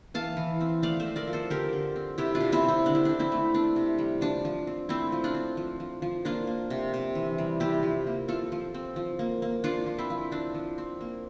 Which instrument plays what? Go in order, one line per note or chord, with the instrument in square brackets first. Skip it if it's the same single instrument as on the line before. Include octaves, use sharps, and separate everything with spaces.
[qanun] E3 F5 A5
E3
C4
A3 D5 F5
C5 E5
C4
A#4 D5
F3
A4 C5
D3 G4 A#4
D3
C4
C3 E4 G4
D4 F4
C3
C4 E4
C3 C4
D3 D4
E4
C4 D4
C4 E4
A3
C4 D4
C3
G3
F3 D4
F3
C4
A3 C4 E4
F3
D4 F4
C4
F3
F3
F3
A#3 D4 F4
A#3
C3
C3
E3
G3
C3 E4 G4
F3
A#3
C4 F4 A4
F3
C4
F3
A#3
A#3
F3 D4 F4
F3
C4 E4
F3
C4 D4
F3
C4
A#3